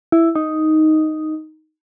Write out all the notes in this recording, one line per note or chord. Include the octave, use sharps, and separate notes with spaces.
E4
D#4